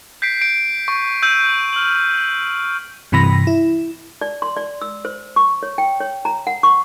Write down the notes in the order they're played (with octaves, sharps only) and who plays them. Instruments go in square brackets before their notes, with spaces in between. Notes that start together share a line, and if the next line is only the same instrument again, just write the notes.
[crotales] G6 B6 C7 D7
D7
C#6
E6 G6 D#7
F6 F#7
[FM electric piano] G2 C3 E3 B5 A#6
E4
[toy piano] D5
C6
D5
E6
C5
C#6
C#5
G5
C#5
A#5
F#5
C#6